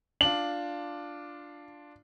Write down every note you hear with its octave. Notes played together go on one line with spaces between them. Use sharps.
D4 F4 F#7